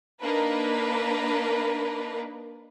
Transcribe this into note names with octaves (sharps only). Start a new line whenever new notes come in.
A#3 D4 D#4 A#4 B4